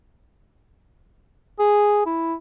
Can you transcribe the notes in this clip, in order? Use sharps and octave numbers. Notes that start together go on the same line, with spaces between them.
G#4
E4